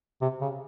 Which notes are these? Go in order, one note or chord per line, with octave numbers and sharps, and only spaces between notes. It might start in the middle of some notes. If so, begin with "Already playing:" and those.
C3
C#3